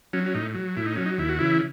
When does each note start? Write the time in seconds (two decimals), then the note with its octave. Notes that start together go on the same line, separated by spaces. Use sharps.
0.13 F#3 C#4
0.26 C#4
0.34 A2 D#4
0.55 F#3
0.77 A2 E4
0.86 D#4
0.96 F#3 C#4
1.05 D#4
1.18 D#2 E4
1.29 F#4
1.39 C#3 E3 E4